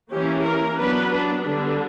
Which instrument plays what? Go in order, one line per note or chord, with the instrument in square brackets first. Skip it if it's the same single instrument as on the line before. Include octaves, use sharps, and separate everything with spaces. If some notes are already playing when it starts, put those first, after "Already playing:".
[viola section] E3 A#3 C#4 G4
A#4
F#3 B3 D4 B4
D4
D3 G3 B3 D4